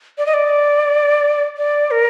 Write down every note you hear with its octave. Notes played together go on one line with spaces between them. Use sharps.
D5
D#5
D5
D5
A#4